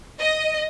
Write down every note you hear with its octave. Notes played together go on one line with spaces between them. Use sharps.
D#5